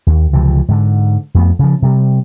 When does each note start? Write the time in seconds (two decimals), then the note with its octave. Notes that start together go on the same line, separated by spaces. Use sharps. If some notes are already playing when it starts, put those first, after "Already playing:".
0.07 D#2
0.33 C#2 C3 E3 F3
0.68 G#2 D3
1.35 F2 A3 B3
1.59 C#3 F3
1.82 C3 G3